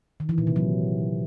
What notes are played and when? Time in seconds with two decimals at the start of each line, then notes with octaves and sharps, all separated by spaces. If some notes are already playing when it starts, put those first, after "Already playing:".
0.20 D#3
0.29 E3
0.38 A#2
0.47 C3
0.56 F#3